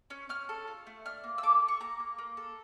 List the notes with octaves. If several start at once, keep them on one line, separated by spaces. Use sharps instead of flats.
C#4
C#4 F6
A4
F4
A3
D4 F6
A#3
E6
A4 D6
A4
C#6
A#3 A#5
A#3
A#3
A4